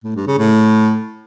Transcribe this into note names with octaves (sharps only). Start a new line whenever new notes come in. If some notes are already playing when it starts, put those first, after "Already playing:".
A2
G2
C#3
A2